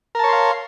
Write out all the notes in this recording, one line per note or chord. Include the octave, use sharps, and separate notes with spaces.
A#4 C#5 F5 A5 C6